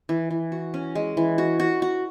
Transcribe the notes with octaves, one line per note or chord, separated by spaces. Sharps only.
E3
E3
F#4
C#4
G#3
E3
F#4
F#4
F#4